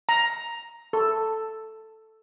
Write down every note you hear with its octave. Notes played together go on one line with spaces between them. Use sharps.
A#5
A4